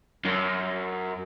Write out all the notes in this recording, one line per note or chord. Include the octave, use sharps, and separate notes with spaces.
F#2